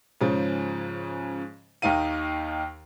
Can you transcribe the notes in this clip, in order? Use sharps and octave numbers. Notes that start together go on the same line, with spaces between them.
G#2 C#3 F3
D#2 D#3 D#4 F5 D#7